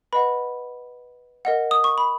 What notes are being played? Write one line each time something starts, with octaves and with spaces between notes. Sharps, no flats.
B4 D#5 F#5 B5
A#4 D#5 F#5
D#6
C#6
B5